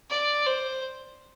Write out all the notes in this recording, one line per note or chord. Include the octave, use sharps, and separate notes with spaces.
D5
C5